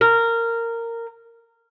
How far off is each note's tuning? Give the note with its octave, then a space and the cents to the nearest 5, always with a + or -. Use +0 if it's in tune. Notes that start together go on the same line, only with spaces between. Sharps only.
A#4 -15